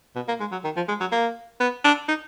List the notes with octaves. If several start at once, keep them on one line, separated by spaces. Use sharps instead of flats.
B2
A#3
G#3
F#3
D#3
F3
G#3
F#3
A#3
B3
D4
D#4